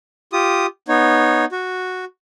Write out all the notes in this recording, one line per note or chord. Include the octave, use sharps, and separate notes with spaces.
F4 G4 D#6
B3 D#4 C#5
F#4